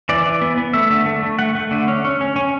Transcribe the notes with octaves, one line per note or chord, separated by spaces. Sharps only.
E3 D5
E3
B3
B3
A3 E5
D3
A3
A3
A3 F#5
A3
D3
C#4
C#4
C#4
C#4